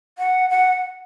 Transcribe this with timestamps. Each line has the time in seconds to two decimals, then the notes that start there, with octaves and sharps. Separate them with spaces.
0.18 F#5
0.50 F#5